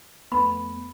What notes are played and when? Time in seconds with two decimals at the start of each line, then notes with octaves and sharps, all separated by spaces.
0.32 F2 A3 B3 B5